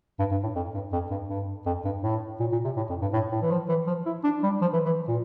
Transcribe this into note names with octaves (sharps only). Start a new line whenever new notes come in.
G2
G2
A2
F2
G2
F2
G2
G2
F2
G2
A2
A#2
A#2
C3
A2
F2
G2
A2
A2
E3
F3
E3
F3
E4
D4
G3
F3
E3
E3
A#2